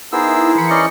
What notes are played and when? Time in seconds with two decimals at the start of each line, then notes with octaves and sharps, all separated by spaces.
0.12 B3 D#4 E4 G#4 A#4 C5 E6
0.35 E4
0.58 E3 B5 C#7
0.70 C#4 D5 D#5